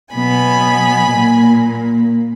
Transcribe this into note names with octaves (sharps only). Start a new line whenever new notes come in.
B2 F#3 B3 G#5 B5
A#2 A#3